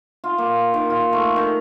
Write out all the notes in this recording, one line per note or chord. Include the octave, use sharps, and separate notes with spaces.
F4
A#3
D#3
F4
A3
D#3